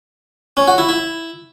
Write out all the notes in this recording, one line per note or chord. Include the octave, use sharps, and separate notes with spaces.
C#4
F#4
E4
E4